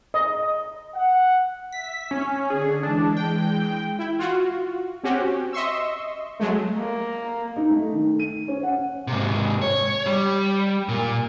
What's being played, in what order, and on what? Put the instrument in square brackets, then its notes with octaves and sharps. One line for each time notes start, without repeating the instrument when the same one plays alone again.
[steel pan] D#5
[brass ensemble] F#5
[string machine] E5 [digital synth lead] B6
[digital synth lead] C#4
[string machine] D3 D4 A4 [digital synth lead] G#4
[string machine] E3 G#3 [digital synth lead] D4
[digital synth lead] G5
[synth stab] E4
F4 F#4
C4 C#4 F#4 G4
D#5 E5 C6 C#6 E6
F#3 G#3 A3
[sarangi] A#3
[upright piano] D#4
A3
D#3
D#7
C#4
F#5
[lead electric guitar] G#2 C3
C#5
G3
A#2